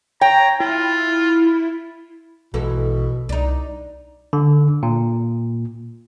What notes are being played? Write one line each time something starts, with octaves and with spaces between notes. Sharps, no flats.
C#5 G5 A#5
E4 F4
A#1 G#2 B2 E3 A4
C2 D4 D#4
D3
A#2